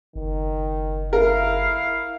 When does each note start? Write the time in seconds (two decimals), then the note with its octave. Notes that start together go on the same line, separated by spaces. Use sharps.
0.16 F#1 D#3
1.13 E4 A#4 F5